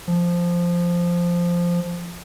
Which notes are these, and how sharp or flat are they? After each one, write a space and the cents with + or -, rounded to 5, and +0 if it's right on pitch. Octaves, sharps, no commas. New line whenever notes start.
F3 -5